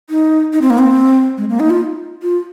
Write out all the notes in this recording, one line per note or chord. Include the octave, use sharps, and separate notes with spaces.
D#4
D#4
C4
A#3
C4
G#3
A#3
D#4
F4
F4